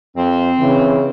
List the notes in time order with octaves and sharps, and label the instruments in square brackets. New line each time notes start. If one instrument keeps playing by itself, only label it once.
[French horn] F2 [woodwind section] C4
[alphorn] C#3 [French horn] E3